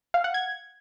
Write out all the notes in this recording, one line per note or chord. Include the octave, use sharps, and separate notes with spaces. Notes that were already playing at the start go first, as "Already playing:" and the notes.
F5
F#5
G#6